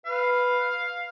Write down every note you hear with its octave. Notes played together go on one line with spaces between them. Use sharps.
B4 F5